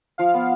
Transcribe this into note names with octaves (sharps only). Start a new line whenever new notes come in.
F3 F5
B3